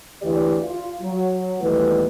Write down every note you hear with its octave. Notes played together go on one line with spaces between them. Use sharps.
D2 E3 G4 D5
F4
F#3
D#2 B2 E3 G3 A3 B4